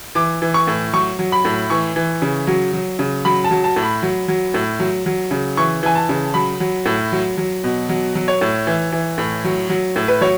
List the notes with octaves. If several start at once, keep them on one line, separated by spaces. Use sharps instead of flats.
E3 D6
E3
C#6
A2
F#3 C#6
F#3
B5
A2
E3 C#6
E3
C#3
F#3
F#3
C#3
F#3 B5
A5
F#3
A5
A2
B5
F#3
F#3
A2
F#3
F#3
C#3
E3 C#6
E3 G#5
A5
C#3
F#3 B5
F#3
A2
F#3
F#3
B2
F#3
F#3
C#5
A2
E3
E3
A2
F#3
F#3
A2
B4
F#3 C#5